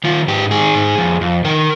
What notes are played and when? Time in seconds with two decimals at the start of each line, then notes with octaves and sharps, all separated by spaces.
0.04 D#3 F4
0.28 G#2 G4
0.51 D#3 G#4
0.75 G#2
0.98 F2
1.21 F2
1.44 D#3 A#4